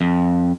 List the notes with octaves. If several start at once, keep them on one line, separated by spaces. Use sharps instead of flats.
F2